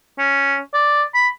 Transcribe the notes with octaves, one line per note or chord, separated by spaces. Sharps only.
C#4
D5
B5